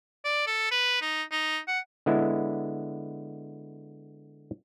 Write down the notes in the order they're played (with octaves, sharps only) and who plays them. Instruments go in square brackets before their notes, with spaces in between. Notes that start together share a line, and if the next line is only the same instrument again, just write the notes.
[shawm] D5
A4
B4
D#4
D#4
F#5
[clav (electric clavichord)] D3 G#3 B3 E4